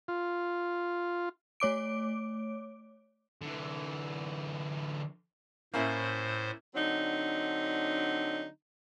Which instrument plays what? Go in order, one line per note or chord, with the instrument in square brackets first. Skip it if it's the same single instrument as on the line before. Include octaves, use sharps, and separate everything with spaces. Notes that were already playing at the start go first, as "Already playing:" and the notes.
[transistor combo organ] F4
[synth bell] A3 C#5 D6 D7
[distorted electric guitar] D3 E3
[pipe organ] A2 C5 [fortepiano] A#3 C#4 E4
[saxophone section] D3 F#3 C4 D4 D#4